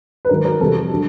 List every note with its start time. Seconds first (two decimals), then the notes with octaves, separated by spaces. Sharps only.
0.25 B4
0.29 G#2 D#3 F#3 A#4
0.45 A#4
0.61 F2 C3 E3 G3 A4
0.92 D3 F#3